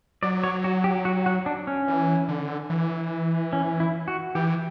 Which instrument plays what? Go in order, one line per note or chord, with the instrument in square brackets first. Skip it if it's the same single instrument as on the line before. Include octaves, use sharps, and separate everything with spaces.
[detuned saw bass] F#3 [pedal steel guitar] D5
[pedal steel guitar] C#5
F#4
G4
F#4
F#4
D4
C#4
[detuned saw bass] E3
D3
E3
[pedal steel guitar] C#4
E4
F#4
[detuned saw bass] E3 [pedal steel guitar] G4